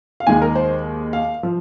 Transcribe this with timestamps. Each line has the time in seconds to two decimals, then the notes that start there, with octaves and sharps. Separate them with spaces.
0.20 F5
0.27 D#2 D#3 G#3 G#5
0.42 A#4
0.56 C5
1.13 F5
1.43 F3